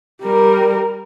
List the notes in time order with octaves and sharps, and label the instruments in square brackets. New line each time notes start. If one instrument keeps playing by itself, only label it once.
[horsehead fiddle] G3 A#4